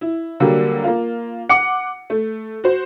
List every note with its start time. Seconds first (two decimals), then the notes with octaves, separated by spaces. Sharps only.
0.01 E4
0.40 D3 F#3 G3 A#3
0.84 A#3 F4
1.49 F#5 D6 C#7
2.10 A3
2.64 F#4 C5